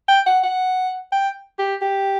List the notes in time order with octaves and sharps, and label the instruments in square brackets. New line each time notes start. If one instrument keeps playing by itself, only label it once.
[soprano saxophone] G5
F#5
F#5
G5
G4
G4